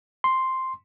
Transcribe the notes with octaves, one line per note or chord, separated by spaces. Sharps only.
C6